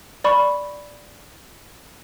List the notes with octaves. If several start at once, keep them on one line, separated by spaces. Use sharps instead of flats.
D5 B5 C#6